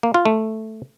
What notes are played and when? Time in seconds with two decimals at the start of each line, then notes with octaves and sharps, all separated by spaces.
0.03 A#3
0.14 F4
0.25 A3